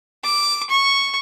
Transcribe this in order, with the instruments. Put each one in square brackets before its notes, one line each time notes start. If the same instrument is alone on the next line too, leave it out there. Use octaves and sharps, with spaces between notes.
[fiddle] D6
C#6